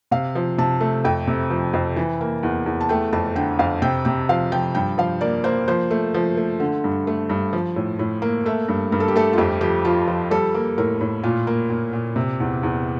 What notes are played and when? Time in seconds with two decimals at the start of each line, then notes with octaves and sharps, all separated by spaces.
0.11 C3 F5
0.35 F3
0.58 C3 A5
0.81 A3
1.04 F2 G5
1.27 C3
1.50 F3
1.73 F2
1.96 E3
2.21 A#3
2.43 E2
2.66 E2
2.81 A5
2.89 A3 G5
3.13 F2 A5
3.35 D3 G5
3.59 F2 F5
3.82 C3 G5
4.05 C3 G5
4.29 F3 F5
4.52 F3 G5
4.75 G2 G5
4.98 F3 F5
5.21 A#3 D5
5.44 A#3 C5
5.68 F3 C5
5.91 A3
6.14 F3
6.37 A3
6.60 D3
6.84 G2
7.07 A3
7.29 G2
7.53 F3
7.76 A2
7.99 A2
8.22 A#3
8.46 A3 E5
8.68 G2
8.92 G2 A#4
9.00 A4
9.08 G4
9.16 A3 A4
9.33 F4
9.38 F2 G4
9.61 F3 G4
9.85 F3 F4
10.08 F3
10.31 G3 A4
10.54 A#3
10.78 A2 A#4
11.01 A2
11.23 A#2 F4
11.47 A#3
11.70 A#2
11.93 A#2
12.16 C3
12.40 E2
12.63 E2